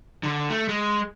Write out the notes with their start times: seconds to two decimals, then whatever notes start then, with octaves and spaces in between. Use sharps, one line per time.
0.23 D3
0.50 A3
0.69 G#3